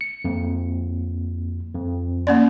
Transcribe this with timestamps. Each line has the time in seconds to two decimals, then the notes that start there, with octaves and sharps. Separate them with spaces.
0.01 C#7
0.25 F2 A#3
1.75 F2
2.27 A#3 C#4 D5